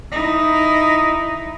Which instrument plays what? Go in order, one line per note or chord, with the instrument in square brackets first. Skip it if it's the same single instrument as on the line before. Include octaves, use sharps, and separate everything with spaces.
[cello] D#4 E4